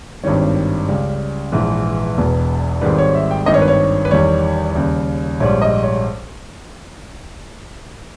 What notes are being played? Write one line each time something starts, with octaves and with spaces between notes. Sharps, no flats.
G#1 G2 D#3 G3 C#5
C#2 C#3 G3
A#1 G#2 E3 B4
E1 E2 B2
G#1 G#2 D#3 G3 B4
C#5
E5
G5
G#1 G2 D#3 G3 D#5
C#5
B4
C#5
B4
E2 D#3 G3 C#5
D#2 C#3 G3
A#1 G#2 G3 C#5
D#5
C#5